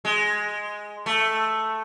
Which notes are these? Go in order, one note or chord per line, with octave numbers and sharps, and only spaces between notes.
G#3
A3